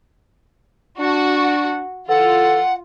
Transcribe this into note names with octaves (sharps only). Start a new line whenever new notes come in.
D4 F#4
E3 F4 A4 F#5